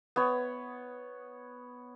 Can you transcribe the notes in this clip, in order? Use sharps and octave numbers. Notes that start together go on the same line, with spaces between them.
B3 C#5